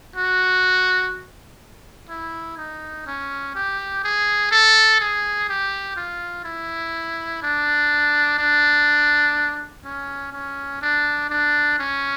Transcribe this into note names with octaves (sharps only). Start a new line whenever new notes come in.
F#4
E4
D#4
C#4
G4
G#4
A4
G#4
G4
F4
E4
D4
D4
C#4
C#4
D4
D4
C#4